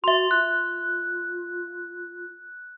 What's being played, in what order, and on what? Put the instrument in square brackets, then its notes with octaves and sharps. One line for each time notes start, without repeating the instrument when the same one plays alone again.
[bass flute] F#4 [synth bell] E5 C6
[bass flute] F4 [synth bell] F#6